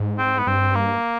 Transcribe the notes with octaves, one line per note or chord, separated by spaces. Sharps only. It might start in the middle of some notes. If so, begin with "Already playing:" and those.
Already playing: G#2
C4
B3
G2 C4
A#3